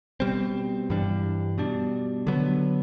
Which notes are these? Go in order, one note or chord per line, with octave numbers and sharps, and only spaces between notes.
B2 G3 C4
G2 E3 G3 D4
B2 G3 D4
D3 F#3 B3